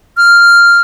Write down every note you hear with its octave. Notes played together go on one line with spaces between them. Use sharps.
F6